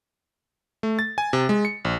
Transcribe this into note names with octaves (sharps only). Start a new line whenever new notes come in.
A3
A6
G#5
C3
G#3
C#7
A#1